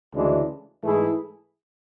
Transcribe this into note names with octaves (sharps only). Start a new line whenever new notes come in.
D2 C#3 E3 G#3 D4
G#2 E3 A3 E4 G#4